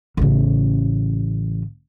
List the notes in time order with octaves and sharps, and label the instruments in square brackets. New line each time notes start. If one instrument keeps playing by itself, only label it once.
[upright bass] A1 C#3